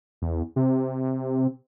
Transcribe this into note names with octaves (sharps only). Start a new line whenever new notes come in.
E2
C3